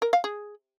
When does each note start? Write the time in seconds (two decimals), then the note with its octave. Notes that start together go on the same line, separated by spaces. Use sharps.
0.02 A#4
0.13 F5
0.24 G#4